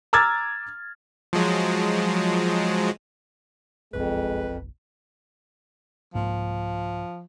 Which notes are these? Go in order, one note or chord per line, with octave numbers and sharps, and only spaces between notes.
A#5 D6 E6 F6 G#6 A6
F3 F#3 G#3
F#1 B1 F2 G#3 B4
C2 G#2 F3 A#3